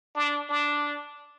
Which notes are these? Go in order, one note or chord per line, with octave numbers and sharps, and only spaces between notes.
D4
D4